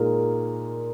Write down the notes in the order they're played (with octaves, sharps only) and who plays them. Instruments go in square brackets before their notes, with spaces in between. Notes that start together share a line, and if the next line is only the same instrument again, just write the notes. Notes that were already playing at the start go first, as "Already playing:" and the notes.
Already playing: [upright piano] A#2 G#3 D#4 G#4 [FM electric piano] A#4